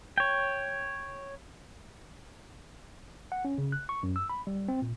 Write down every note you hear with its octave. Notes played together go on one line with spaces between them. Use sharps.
C#5 G5
F#5
C#4
C#3
F#6
C#6
F#2
E6
B5
G3
C4
A#2